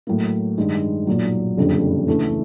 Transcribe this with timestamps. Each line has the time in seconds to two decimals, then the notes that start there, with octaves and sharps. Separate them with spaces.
0.07 A2 F#3 A#3
0.58 G2 D#3 G#3
1.07 B1 A#2 F#3
1.57 F#1 F2 D3 G3
2.08 D2 C#3 E3 A3